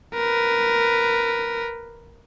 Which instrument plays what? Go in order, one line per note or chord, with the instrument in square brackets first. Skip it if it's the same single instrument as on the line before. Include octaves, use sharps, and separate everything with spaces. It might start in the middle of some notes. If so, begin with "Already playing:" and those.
[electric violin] A#4 B4